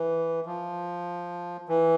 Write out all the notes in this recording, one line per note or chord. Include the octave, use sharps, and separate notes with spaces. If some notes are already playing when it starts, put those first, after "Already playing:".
Already playing: E3
F3
E3